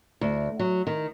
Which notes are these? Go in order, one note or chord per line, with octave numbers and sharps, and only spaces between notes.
D2
F#3
D#3